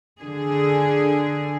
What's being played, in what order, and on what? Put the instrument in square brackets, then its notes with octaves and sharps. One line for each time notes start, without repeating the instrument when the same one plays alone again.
[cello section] D3 G#4